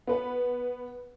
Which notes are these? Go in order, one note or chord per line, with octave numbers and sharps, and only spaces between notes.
B3 B4